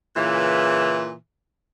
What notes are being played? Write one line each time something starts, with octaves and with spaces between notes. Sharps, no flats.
A#2 C#3 E3